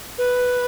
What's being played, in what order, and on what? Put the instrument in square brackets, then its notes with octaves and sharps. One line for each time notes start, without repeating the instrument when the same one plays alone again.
[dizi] B4